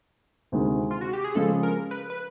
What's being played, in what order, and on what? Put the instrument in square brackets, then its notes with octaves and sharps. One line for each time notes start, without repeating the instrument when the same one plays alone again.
[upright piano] D2 C3 D#3 G#3
[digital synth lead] F4
F#4
G4
G#4
[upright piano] C#3 F3 G#3 [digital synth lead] A4
[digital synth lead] A#4
B4
B4